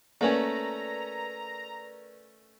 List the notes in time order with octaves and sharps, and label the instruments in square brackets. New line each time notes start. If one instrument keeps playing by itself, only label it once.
[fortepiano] A3 C#4 [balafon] A#3 G#5 [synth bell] A#4 B4 D5 [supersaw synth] A#5